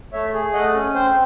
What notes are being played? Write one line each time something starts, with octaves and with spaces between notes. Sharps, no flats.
A3 C#5 E5
G#4
A3 D#5 F#5
C#4
C4 C5